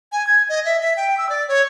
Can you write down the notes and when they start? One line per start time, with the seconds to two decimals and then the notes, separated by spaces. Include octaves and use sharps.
0.12 G#5
0.27 G#6
0.49 D#5
0.65 E5
0.81 E5
0.97 G5
1.18 E6
1.29 D5
1.48 C#5